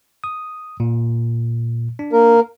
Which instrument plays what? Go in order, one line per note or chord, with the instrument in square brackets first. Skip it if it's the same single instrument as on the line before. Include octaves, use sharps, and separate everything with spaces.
[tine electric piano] D#6
A#2
D4
[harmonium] A#3 A#4